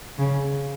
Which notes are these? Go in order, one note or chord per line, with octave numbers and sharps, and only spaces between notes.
C#3